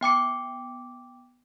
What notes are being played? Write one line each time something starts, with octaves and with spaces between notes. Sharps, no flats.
B3 G5 D6 C#7